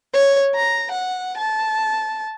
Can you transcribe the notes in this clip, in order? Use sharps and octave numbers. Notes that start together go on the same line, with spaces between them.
C#5
A#5
F#5
A5